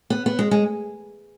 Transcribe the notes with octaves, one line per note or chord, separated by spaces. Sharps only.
B3
B3
G#3
G#3